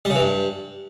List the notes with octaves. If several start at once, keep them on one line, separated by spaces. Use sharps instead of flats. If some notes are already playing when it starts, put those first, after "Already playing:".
G3
C#3
E3
G2